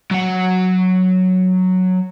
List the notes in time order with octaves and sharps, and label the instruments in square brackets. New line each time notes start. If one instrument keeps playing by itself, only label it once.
[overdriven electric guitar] F#3 F#5